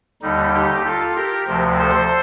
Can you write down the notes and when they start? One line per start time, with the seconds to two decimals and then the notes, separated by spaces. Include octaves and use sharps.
0.22 D#2 D3 G3 D#4
0.54 D#4 G4
0.85 F4 A4
1.16 G4 A#4
1.47 D2 C3 F3
1.79 A4 C5